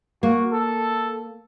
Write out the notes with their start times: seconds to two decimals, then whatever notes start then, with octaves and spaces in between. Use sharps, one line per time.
0.23 A#3 F#4
0.52 A4